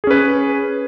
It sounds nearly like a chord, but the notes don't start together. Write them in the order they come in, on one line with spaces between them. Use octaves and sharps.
G#4 C#4 B4